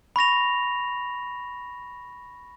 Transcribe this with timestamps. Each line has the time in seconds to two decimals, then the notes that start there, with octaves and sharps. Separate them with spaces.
0.16 B5 C#6 A#6 F7